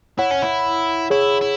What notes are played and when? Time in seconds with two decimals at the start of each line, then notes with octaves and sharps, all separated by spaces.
0.19 E4 C#5 F#5
0.31 C#4
0.43 E4
1.10 E4 G#4 C#5
1.41 E4